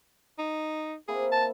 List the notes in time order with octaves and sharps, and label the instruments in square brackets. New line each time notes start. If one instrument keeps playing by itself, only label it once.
[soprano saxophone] D#4
[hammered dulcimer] A#3 C4 E4 [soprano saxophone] G#4
[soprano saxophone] A5